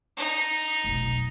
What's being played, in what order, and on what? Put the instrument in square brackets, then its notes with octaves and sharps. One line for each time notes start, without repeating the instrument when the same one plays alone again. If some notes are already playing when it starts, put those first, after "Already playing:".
[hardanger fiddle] D#4
[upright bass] F1 B1